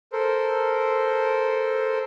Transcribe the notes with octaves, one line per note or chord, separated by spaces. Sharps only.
A4 A#4 C5